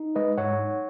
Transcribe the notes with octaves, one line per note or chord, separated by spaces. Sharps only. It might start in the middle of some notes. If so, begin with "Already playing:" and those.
Already playing: D#4
G#3 B4 D#5
G#2 C#5 F#5
D#4